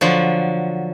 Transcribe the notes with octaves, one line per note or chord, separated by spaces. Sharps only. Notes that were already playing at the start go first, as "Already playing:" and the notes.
D3 F3 F#3